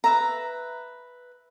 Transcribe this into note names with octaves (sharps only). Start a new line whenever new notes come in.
B4 E5 A#5